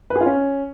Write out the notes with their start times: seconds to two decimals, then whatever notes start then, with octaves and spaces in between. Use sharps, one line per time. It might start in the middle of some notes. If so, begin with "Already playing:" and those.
0.10 B4
0.16 G#4
0.21 F4
0.26 C#4